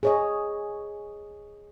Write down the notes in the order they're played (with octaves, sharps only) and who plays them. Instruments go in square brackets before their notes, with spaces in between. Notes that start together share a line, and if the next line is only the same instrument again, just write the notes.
[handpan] G#4 C#5 D#5